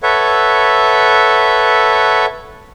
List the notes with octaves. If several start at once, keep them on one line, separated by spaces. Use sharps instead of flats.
A4 B4 C#5 E5 F#5